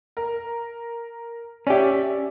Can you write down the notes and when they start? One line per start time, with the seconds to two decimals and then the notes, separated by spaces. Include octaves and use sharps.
0.17 A#4
1.67 C#4 G4 D5 E5